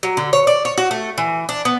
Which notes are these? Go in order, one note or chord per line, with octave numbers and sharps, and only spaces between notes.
F#3
D3
C#5
D5
C#5
F#4
A3
E3
D4
B3